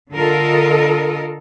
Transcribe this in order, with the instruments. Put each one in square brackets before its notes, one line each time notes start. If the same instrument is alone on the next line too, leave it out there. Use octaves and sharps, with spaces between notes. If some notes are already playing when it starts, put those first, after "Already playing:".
[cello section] D3 F4 A4 A#4 D#5